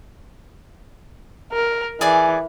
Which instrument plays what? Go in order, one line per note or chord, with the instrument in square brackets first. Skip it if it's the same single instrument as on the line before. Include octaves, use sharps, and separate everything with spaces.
[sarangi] A#4
[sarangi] E3 [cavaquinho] G#4 D5 G#5